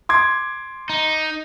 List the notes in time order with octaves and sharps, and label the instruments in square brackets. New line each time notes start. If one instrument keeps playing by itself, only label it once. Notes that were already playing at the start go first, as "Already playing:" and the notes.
[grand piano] C6 D6 G#6
[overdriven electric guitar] D#4